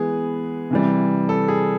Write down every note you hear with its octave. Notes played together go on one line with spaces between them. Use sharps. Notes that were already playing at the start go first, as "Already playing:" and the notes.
Already playing: E3 G#3 B3 G#4
C3 E3 G3
A4
G#4